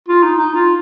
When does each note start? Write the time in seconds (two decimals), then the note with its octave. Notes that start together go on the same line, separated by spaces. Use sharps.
0.09 F4
0.23 D#4
0.38 D#4
0.54 F4